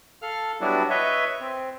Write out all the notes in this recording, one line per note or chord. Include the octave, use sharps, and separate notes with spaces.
A4 F5 F6
F#3 G3 B3 D4 E4 F#4
B4 C#5 D#5 E5
C4